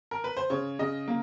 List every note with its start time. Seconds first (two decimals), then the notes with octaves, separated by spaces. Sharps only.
0.11 A#4
0.24 B4
0.37 C5
0.50 C#3 C#5
0.79 C#3 D#5
1.08 A#3